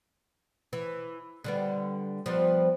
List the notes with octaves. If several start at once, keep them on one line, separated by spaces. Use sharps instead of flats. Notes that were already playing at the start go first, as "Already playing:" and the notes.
E3
D3 G3 B3
F3 G3 B3